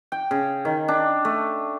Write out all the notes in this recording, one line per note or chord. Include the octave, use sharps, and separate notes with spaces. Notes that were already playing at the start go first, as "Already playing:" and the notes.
G5
C#3
D#3
D4
A3